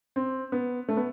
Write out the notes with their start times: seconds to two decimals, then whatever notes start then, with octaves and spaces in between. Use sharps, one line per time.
0.16 C4
0.52 B3
0.88 A3
0.97 B3